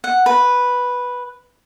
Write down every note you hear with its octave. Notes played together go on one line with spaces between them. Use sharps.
F#5
B4